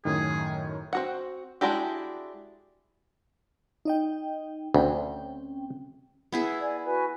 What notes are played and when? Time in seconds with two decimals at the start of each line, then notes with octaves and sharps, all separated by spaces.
0.05 F#2 A2 D#3 G#4
0.93 C4 F#4 F#5
1.61 G#3 D4 E4 F#4 G4
3.85 D#4 D#5 G5
4.74 D2 C4 C#4 G5
6.32 B3 E4 G#4
6.61 D5 G#5
6.85 F#4 B4 G#5